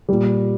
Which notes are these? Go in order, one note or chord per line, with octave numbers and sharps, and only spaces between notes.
A#2 G3